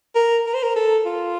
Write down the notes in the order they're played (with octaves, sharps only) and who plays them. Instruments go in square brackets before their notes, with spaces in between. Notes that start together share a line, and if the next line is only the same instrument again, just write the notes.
[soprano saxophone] A#4
A#4
C5
A#4
A4
F4